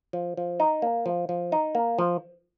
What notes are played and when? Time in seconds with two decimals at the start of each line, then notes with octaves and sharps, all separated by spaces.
0.13 F3
0.37 F3
0.60 D#4
0.82 A#3
1.06 F3
1.29 F3
1.52 D#4
1.75 A#3
1.98 F3